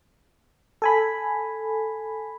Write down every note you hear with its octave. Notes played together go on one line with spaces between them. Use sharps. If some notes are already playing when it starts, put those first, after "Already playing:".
A4 G#5 B5